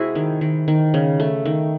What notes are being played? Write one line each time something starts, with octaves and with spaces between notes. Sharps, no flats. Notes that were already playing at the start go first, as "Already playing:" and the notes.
Already playing: C3 G#3 E4 F#4 G#4 C5
D#3
D#3
D#3
C#3
A3
D#3